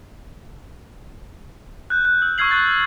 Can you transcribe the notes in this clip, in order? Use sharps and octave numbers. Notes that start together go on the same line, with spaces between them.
F#6 G6
F#6
E6
C#6 E6 F6 G#6 C7 F#7
C#6 F#6 A6